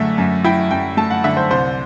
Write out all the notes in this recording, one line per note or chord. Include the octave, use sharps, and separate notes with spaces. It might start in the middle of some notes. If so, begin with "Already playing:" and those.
Already playing: F#2 D3 A3 E5
F#2
E4 G5
F#2 G5
A3 A5
F#5
D3 E5
C5
C2 C5